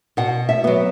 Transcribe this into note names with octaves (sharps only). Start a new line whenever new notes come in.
B2 F#5
E5
F#3 B3